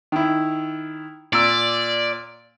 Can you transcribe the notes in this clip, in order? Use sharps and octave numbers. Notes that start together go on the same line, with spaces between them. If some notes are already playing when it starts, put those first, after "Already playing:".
D#3 E4
A#2 D5 E6